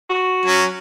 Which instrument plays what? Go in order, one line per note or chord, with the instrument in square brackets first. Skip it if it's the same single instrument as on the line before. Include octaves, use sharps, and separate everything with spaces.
[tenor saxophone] F#4
[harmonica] F#3 C#4